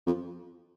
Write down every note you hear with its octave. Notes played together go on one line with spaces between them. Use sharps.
F2